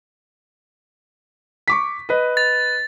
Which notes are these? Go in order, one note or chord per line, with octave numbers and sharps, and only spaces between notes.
C#6 D6 B6
B4 D#5
A6